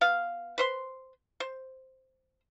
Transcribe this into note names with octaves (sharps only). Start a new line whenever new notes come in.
B3 F5
B4 C5 C6
C5